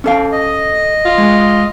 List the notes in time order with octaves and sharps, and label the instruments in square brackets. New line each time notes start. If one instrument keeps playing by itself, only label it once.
[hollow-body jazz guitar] C#4 A4 F5
[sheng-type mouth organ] D#5
[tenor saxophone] F4
[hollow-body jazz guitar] G#3